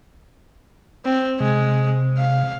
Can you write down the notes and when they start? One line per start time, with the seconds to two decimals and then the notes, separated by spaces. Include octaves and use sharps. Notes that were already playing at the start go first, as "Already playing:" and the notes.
1.05 C4
1.40 C3 G#3
2.18 F5